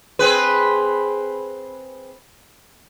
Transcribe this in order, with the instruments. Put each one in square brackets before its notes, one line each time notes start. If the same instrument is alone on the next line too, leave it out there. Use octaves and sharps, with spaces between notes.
[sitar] C4 G#4 B4